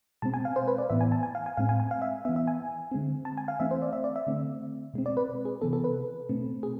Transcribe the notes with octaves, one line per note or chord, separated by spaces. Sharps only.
B2 G#3 C4 A5
G#5
F5
C5
B4
D5
A2 E3 B3 E5
G#5
A5
G#5
F5
G#5
A2 G#3 C4 F5
G#5
G#5
F5
E5
E3 B3 E5
E5
G#5
D3 G#3 C4
A5
G#5
F5
E3 A3 C4 E5
C5
D5
E5
D5
E5
D3 A3 C4
B2 G#3 C4
D5
B4
G#4
C3 E3 B3 A4
A4
B4
B2 A3 C4
G#4